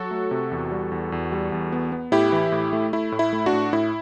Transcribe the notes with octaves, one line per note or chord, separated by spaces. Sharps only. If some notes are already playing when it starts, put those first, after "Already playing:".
Already playing: F#3 F#4 A4
A3
C3
E2
G3
E2
E2
G3
E2
B3
B3
A2 E4 G4
E3
A2
A3
A3 E4
A2
E4
A3
D4 F#4
A2
A2 E4